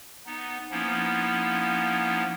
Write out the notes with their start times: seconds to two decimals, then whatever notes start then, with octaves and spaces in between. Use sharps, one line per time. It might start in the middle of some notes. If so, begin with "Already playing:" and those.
0.26 B3 D#4
0.71 F3 A#3 B3 C#4 D#4 E4